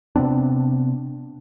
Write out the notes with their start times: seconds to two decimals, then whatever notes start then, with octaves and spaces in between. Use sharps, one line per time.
0.16 C3 B3 C4 D4